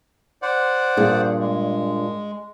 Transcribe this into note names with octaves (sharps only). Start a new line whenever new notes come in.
C5 D5 F#5
G2 A#2 G#4
G#3